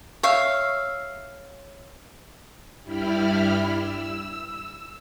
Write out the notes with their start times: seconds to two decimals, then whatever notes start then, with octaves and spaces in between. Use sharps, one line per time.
0.23 C#5 E5 F5
2.83 G2 G3 E4 G4 B5 F6
3.72 E6